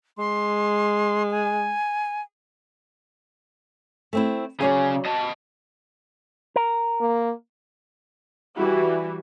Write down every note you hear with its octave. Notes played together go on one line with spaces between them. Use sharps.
G#3 C6
G#5
A3 C4 E4
C#3 F#3 G#4 C#5 D5
D#5 A5
A#4
A#3
E3 G3 E4 F#4